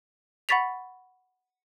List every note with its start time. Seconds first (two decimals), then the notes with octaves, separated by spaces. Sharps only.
0.49 F#5 B5 C#6 A6 B6 F7